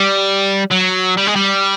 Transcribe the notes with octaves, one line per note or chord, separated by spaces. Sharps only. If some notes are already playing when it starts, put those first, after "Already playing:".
Already playing: G3
F#3
G3
G#3
G3